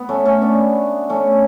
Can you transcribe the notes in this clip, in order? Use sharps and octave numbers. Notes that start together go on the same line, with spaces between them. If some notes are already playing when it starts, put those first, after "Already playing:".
Already playing: B3
A3 C#4
A3 C#4
B3 D4
A3 C#4